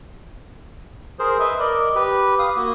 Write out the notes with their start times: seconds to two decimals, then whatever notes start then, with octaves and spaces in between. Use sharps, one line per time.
1.19 G#4 A#4 C5
1.40 B4 D#5 E5
1.60 A#4 D5 D#5
1.95 G4 B4
2.39 F5 D#6
2.57 A#3 F#4